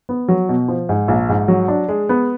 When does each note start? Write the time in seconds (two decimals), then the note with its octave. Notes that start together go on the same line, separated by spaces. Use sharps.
0.09 B3
0.28 F#3
0.49 B2
0.68 F3
0.89 G#2
1.08 A#1
1.29 G#2
1.48 F#3
1.68 D4
1.89 G#3
2.09 B3